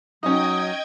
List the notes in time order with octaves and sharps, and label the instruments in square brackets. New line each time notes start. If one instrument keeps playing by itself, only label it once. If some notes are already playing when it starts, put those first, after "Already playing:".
[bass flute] F#3 [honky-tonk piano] C#4 D#4 [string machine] D#5 G5 G#6 [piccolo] D#6